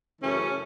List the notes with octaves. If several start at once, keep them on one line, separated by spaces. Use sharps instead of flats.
F#2 C#3 E3 A3 C#4